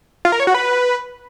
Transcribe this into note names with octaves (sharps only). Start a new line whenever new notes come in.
F4
A#4
C#5
F#4
B4